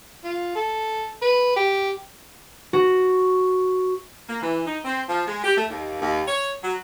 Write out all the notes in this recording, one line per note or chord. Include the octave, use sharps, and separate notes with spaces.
F4
A4
B4
G4
F#4
A#3
E3
D#4
C4
F3
G#3
G4
A3
D#2
D#2
C#5
F#3